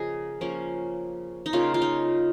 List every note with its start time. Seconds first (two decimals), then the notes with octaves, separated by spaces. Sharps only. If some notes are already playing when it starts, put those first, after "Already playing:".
Already playing: C#3 F3 A#3 G#4 D#5
0.41 F3 A#3 C#4
1.46 D#4
1.53 C#3 A#3 C#4 F4
1.74 F4
1.82 D#4